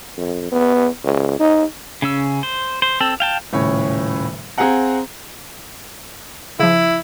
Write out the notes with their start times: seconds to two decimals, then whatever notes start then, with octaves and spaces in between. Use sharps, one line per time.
0.17 F2
0.51 B3
1.04 C#2
1.39 D#4
2.02 C#3 C#4 E6
2.43 C5
2.82 C5
3.00 C4 A4
3.20 F5 G5 A5
3.53 D#1 A2 C#3 C#5
4.58 C4 G#4 F5 F#5 A#5
6.59 C#3 F3 E4